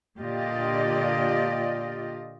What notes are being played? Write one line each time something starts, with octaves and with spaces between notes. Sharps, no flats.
A#2 D3 F4 G4 D5 D#5